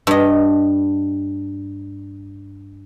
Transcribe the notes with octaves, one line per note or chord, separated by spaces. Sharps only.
G2 D#5